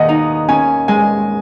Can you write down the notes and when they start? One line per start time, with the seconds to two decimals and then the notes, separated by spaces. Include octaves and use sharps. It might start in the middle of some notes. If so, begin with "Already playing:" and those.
Already playing: D#2 D#3 D#5 F#5
0.09 D#4
0.49 C#4 G#5
0.88 G#3 G#5